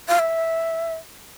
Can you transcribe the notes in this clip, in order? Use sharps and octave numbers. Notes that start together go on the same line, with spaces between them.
F5
E5